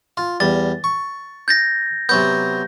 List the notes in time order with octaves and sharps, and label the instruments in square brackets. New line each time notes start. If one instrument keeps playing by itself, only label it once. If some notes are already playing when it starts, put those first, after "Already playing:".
[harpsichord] F4
[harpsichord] E2 G3 [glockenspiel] A6
[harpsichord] C#6
[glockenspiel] G6 A6 A#6
[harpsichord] C3 F#3 B3 [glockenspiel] G6